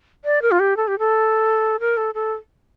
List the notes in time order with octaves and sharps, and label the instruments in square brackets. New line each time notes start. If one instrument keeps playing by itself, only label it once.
[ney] D5
A#4
F4
G4
A4
G4
A4
A#4
A4
A4